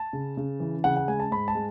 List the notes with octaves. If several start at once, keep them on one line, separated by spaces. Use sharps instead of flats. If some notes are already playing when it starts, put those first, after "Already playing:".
Already playing: A5
C#3
C#3
E3
C#3 F#5
F#5
G#3 G#5
A5
G#2 B5
A5
G#3